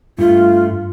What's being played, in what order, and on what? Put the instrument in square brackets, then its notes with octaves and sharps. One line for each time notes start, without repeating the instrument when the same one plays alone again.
[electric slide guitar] G2 A3 [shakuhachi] F4